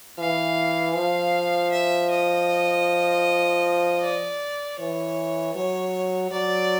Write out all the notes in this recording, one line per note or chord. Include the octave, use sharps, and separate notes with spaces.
E3 F5
F3 F5
E5
D#5
D5
E3 C#5
F#3 C#5
F#3 D5